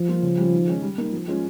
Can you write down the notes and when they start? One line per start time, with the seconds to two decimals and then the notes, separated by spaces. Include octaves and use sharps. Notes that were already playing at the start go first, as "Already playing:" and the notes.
Already playing: F3
0.08 G3 A#3 F4
0.22 C#3
0.38 G3 C#4 F4
0.53 D#3
0.68 G#3 C#4
0.82 G3
0.98 A#3 D#4
1.13 F3
1.28 G#3 C#4 F4